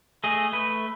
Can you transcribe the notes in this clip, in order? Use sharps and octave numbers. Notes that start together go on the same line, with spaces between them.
A3 G#4 D#5
A3 B4